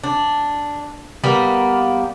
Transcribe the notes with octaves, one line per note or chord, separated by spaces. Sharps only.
D4
G3 A#3 B3